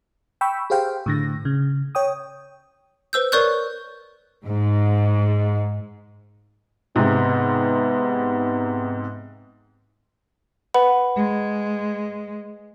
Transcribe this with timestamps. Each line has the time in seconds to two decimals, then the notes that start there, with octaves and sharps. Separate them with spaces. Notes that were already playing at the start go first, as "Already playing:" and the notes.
0.41 G5 B5 C#6 E6
0.70 G4 G#4 C5 F5 G5
1.06 A2 D3 A#6
1.45 C#3
1.95 C#5 G5 D#6
3.13 B4 C5 E6 G6
3.32 A#4 C#5 D5 C#6 F#6 G6
4.44 G#2
6.96 G#2 C3 B3
10.74 B4 F#5 B5
11.17 G#3